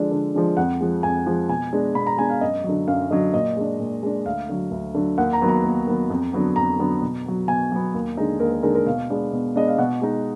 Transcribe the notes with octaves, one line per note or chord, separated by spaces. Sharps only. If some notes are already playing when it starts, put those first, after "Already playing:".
Already playing: D3 F3 G#3 D4
D3
F3 G#3 D4
F2 F#5
F3 G#3
F2 G#5
F3 G#3
B2 G#5
G#3 B3 D4
B2 B5
A#5
G#3 B3 D4 G#5
F5
F#2 D#5
D3 F#3
F#2 F5
D3 F#3 D#5
A#2 D#5
G#3 D4
A#2
G#3 D4
D2 F5
D3 F#3
D2
D3 F#3
D#2 F#5
A#5
D#3 F#3 B3
A#5
D#2
D#3 F#3 B3
F2
D3 F#3 B3
F2 A#5
D3 F#3 B3
B2
F#3 B3
B2 G#5
F#3 B3
D#2
D3 G#3 D#4
D#2 A#4
A#4
D3 G#3 D#4 A#4
A#4
B2 F5
G#3 B3 D4
B2
G#3 B3 D4 D#5
F5
B2 F#5
G#3 D#4